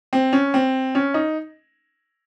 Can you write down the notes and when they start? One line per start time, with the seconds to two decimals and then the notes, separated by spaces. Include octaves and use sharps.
0.13 C4
0.33 C#4
0.54 C4
0.95 C#4
1.14 D#4